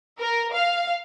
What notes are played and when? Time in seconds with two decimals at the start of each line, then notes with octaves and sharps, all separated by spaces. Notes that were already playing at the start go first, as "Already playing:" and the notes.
0.20 A#4
0.53 F5